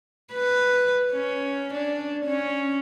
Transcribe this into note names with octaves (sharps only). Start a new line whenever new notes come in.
B4
C#4
D4
C#4